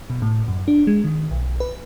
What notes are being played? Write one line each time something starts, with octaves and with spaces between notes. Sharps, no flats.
B2
A2
F#2
D4
G#3
D#3
B1
B4